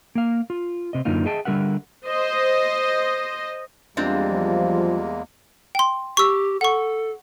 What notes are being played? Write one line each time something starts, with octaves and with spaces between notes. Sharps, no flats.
A#3 F5
F4
C3 D#5
F#2 D3 A#3 D#4 F4
G#4 D#5 E5 G5 A5
D3 G3 F4 A#4 E5 F#5
C5 D#5
E2 G3 G#3 A#3 C4 D4 F4
F3
G5 C6
G4 C#6 E6
A4 F#5 C#6